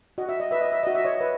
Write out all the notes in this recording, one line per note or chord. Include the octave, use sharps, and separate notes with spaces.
F#4 D#5
E5
D#5
B4 E5
D#5
E5
F#4 D#5
E5
C#5 D#5
B4